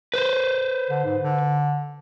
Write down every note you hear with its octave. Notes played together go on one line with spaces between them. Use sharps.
B4 C5
D3
G#2
D3